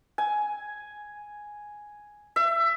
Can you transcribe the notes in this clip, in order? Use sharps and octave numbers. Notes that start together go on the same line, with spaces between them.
G#5
E5